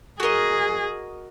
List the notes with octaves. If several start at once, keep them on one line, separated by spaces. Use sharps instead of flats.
F#4 G#4 A#4 D#5